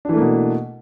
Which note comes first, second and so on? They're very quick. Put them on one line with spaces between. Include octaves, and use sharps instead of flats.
D4 E3 A3 A#3 B2